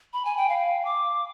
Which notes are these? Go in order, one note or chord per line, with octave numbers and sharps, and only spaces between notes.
B5
G#5
G5
F5
D6